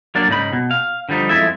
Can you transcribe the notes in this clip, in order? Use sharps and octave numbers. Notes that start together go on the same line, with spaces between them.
F#3 A#3 D4 D5
G#2 C#3 D#4 B5
B2
F5
D3 F3 G3 D#4
F2 G#3 E4 A4 E5